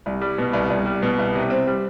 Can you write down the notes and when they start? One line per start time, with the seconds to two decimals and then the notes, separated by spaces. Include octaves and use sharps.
0.06 C2
0.21 G3
0.38 B2
0.53 C2
0.70 C2
0.86 G3
1.02 B2
1.19 C2
1.35 C3
1.50 C4
1.67 G3